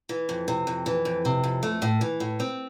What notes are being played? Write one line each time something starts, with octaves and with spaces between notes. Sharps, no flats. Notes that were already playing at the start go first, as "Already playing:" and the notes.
E3
F2
C3
F2
E3
F2
C3
F2
A3
A2
E3
A2
C4